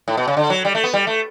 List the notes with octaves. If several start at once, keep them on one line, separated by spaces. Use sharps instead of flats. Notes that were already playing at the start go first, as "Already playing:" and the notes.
A2
B2
C#3
D3
F#3
G3
A3
B3
G3
A3